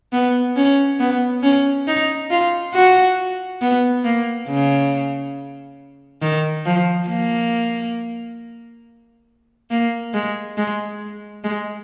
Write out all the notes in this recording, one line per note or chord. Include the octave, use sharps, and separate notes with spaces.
B3
C#4
B3
C#4
D#4
F4
F#4
B3
A#3
C#3
D#3
F3
A#3
A#3
G#3
G#3
G#3